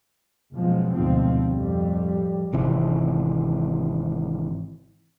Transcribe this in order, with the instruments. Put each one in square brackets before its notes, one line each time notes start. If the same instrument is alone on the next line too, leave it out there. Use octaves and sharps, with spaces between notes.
[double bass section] F#1 B2 F3 G#3
D2 G#2 B2 F3 C4
F2 A2 G3
[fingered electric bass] G#1 C3 E3